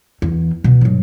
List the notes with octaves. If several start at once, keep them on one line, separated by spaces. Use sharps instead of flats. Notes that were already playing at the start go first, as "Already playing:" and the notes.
E2
B2
G2 F#3